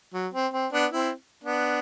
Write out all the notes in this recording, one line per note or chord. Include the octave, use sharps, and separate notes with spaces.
F#3
C4
C4
B3 D4
C4 E4
B3 D4